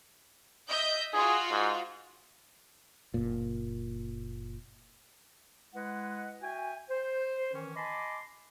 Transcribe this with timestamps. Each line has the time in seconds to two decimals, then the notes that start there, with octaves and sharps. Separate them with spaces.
0.69 D#5 E5 G6
1.13 F4 F#4 G#4
1.51 G#2
3.14 F#1 A#2
5.74 G#3 E4 B4 D#5 F#5
6.42 F#4 E5 G5 G#5
6.90 C5
7.53 D#3 E3 C#4
7.76 D#5 G#5 A5 B5 C6 D6